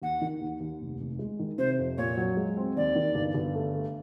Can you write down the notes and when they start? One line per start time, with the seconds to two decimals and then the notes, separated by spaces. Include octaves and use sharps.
0.02 D#2 F#5
0.22 D#3
0.41 D#2
0.60 D#2
0.81 F1
1.00 F1
1.19 G#3
1.39 D#3
1.58 C3 C5
1.79 F2
1.98 A#2 C#5
2.17 F#3
2.37 G#3
2.57 C4
2.76 D#2 D5
2.96 D#3
3.15 G1
3.34 G1
3.55 A3
3.74 A3